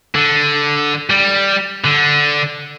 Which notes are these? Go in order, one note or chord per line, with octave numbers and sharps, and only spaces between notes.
D3
G3
D3